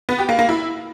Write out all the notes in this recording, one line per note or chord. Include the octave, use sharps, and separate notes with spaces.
B3
G4
A#3
A#3
E4